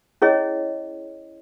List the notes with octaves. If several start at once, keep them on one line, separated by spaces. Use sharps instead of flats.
C#4 E4 G#4 C#5 D#5